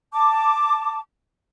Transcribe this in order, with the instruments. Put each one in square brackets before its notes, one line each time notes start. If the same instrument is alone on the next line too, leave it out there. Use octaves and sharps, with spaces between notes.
[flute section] A5 D6